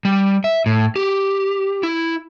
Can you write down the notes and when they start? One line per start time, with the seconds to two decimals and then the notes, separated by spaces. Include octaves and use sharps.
0.05 G3
0.44 E5
0.66 A2
0.96 G4
1.83 E4